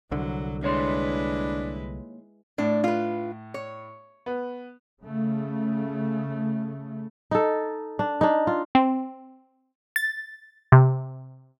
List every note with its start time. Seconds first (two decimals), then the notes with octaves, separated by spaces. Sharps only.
0.11 C2 D3 F#3
0.63 D#2 G#3 D4 E4 B4 C#5 C6
2.58 A2 D4
2.84 F4 B4
3.54 C#5
4.26 B3
5.04 C#3 A3
7.31 D#4 A4
7.99 D4
8.21 D4 D#4
8.47 F4
8.75 C4
9.96 A6
10.72 C3